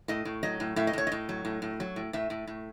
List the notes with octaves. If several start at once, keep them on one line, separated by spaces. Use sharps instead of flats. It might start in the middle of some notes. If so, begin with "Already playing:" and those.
A2 D#5
A2
F#3 D#5
A2
A2 E5
D#5
A2 C#5
A2 D#5
F#3
A2
A2
F#3
A2
A2 E5
A2
A2